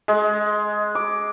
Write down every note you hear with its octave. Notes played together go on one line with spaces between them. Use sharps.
G#3
D6